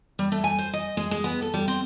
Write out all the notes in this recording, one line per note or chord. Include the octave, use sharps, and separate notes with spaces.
G3
A3
G#5
C5
D#5
G#3
G#3
B3
A4
G3
C4